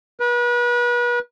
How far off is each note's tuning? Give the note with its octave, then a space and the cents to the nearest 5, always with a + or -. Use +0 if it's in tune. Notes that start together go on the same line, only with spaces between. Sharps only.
B4 -35